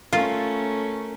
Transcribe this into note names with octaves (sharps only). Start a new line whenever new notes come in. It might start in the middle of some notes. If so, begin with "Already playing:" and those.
A3 C#4 F4 A4 A#4